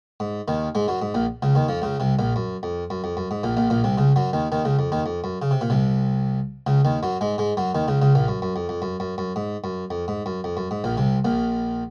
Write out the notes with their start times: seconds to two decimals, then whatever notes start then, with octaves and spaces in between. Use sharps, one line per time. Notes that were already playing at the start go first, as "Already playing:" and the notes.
0.20 G#2
0.48 D#2 D#3
0.75 G#2 G#3
0.88 F#2 F#3
1.02 G#2
1.14 A#1 A#2
1.42 C#2 C#3
1.55 D#2 D#3
1.68 F2 F3
1.82 C#2 C#3
2.00 C2 C3
2.19 A#1 A#2
2.36 F#2
2.63 F2
2.90 F#2
3.04 F2
3.17 F#2
3.31 G#2
3.43 A#1 A#2
3.57 A#1 A#2
3.70 A#1 A#2
3.84 C2 C3
3.98 C#2 C#3
4.16 F#2 F#3
4.33 D#2 D#3
4.52 D#2 D#3
4.65 C#2 C#3
4.79 F2
4.92 D#2 D#3
5.06 F2
5.24 F#2
5.42 C#3
5.51 C3
5.61 A#2
5.70 C2 C3
6.66 C#2 C#3
6.85 D#2 D#3
7.03 F#2 F#3
7.21 G#2 G#3
7.38 G#2 G#3
7.57 F#2 F#3
7.75 D#2 D#3
7.88 C#2 C#3
8.02 C#2 C#3
8.15 A#1 A#2
8.28 F#2
8.42 F#2
8.56 F2
8.69 F2
8.82 F#2
9.00 F#2
9.18 F#2
9.36 G#2
9.64 F#2
9.91 F2
10.08 G#2
10.26 F#2
10.44 F2
10.57 F#2
10.71 G#2
10.84 A#1 A#2
10.97 C2 C3
11.25 A#1 A#2